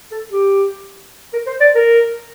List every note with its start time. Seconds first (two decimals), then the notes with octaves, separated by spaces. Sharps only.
0.12 A4
0.32 G4
1.34 A#4
1.47 C5
1.61 D5
1.75 A#4